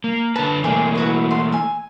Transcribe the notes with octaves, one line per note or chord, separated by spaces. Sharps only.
A#3
D3 B4 A5
E3 A3 A#3 C4 G#4 D5
E4 F#4 B4
C6
G#5 E6